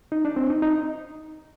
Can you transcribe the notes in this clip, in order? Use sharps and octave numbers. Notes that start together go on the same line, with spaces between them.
D#4
D4
C4
D#4
D#4